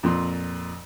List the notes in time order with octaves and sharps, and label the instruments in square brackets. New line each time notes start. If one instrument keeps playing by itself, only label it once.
[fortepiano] F2 A#2 C6